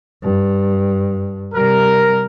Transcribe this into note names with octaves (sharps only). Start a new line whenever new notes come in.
G2
C3 G3 A#4